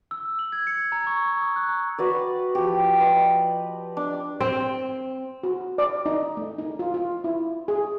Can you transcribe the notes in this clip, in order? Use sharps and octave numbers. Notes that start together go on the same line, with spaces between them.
E6
F#7
G#6
C#7
A#5
C#6
C#6
D#6
F#6
A#5
F#4 B4 D5
F3 G4
B4 D5 D#5
D4
C4
F#4
D5
D#4
A3
D#4
F4
F4
E4
G#4